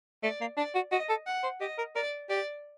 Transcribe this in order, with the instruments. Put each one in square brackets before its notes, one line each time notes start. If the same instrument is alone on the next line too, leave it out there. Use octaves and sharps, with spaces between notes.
[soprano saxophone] A3 [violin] D5
[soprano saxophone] A#3
[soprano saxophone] D4 [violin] D5
[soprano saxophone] F#4
[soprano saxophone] F#4 [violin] D#5
[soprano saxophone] A4
[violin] F#5
[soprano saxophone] C5
[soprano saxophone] G4 [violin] D#5
[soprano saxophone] A#4
[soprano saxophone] A#4 [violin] D5
[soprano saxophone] G4 [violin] D5